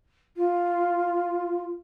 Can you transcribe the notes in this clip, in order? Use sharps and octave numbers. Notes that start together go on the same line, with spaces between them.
F4